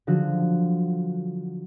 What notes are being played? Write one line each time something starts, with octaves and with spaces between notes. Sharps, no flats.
D3 F3 F#3 F#4